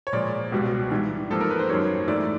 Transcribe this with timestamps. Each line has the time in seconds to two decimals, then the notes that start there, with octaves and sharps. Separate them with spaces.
0.07 C#5
0.13 A#2 F3 G#3 D5
0.52 C#2 B2 G3
0.91 G#2 E3 G3
1.30 G#2 F3 A#3 A4
1.41 A#4
1.50 B4
1.59 C5
1.68 F#2 D#3 G3 A#3 C#5
2.08 G#2 E3 A3 D5